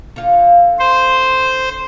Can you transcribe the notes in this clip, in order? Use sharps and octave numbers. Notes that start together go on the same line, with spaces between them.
D3 F4
C5